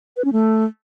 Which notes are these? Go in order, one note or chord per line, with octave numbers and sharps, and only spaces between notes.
B4
C#4
A3